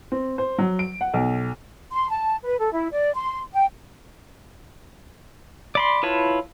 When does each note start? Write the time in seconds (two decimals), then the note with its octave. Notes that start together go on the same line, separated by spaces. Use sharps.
0.12 C4
0.38 C5
0.58 F#3
0.79 D7
1.01 F#5
1.14 B1
1.92 C6
2.10 A5
2.44 B4
2.59 A4
2.72 E4
2.92 D5
3.15 C6
3.54 G5
5.75 D5 B5 C6
6.03 E4 F4 B4 C#5 A5